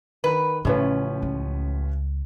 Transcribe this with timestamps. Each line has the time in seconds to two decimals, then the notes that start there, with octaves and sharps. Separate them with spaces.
0.24 D#3 B4
0.65 A1 A2 C#3 F3 C#4 B4
1.22 C#2